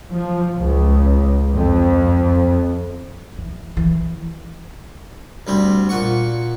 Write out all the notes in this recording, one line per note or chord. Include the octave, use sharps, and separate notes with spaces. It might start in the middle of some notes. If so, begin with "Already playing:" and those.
F3
C#2
F2
E3
E3
D2 G3 C4
A#2 F#5 C#6